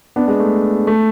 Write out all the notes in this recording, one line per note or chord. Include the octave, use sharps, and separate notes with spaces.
B3 D4
G#3 B3
A3
A3